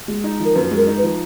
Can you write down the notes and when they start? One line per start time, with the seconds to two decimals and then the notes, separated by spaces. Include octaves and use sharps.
0.08 G#3
0.24 D#4
0.40 F3
0.45 A#4
0.55 F#2 B4
0.71 G#3
0.77 A#4
0.87 D#4
0.98 B4
1.03 F3